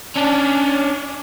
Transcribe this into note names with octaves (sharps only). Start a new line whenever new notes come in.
C#4 D4